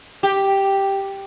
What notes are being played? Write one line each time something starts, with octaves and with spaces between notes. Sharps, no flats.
G4